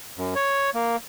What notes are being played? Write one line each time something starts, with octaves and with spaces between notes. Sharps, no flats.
F#2
C#5
A#3